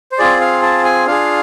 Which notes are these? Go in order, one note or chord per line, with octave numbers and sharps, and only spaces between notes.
C5
C4 F4 G#4 D5
F5
A5
G#5
D4 F4 G#4 F5